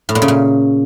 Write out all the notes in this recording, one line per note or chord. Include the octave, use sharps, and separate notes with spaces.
A2
A#2
C#3
A#2